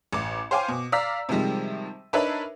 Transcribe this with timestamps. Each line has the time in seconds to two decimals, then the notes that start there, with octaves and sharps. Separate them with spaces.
0.13 A1 D6
0.51 C5 C#5 F5 G5 G#5 D6
0.68 B2
0.92 D5 F5 A#5 E6 B6
1.29 C3 D#3 F3 G3 G#3
2.13 D4 D#4 A#4 B4 C#5 E5